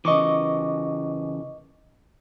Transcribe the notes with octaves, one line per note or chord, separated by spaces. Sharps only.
C#3 E3 D#5 C#6 D6